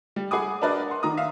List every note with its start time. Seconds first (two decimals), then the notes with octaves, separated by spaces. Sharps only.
0.16 G3
0.31 G#4 F#5 G#5 B5 D6 D#6
0.62 D4 F#4 A#4 B4 D5 D#5
0.88 F#5 C6
1.03 D#3 A#5 D#6
1.17 E5 F5